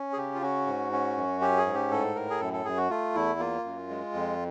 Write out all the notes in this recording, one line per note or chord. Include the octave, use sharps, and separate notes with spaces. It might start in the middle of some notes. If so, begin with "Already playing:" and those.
Already playing: C#4
G#4
C#3 G4
F4
C#4 F#4
G#2
C#4
F#2
C#4 G4
G#4
G#2
G4
A2 A4
A2 A#4
G#4
F#2 A4
A4
F#2 G#4
F#4
A3 F4
E2 E4
A#3 F4
F#2
G#3
F2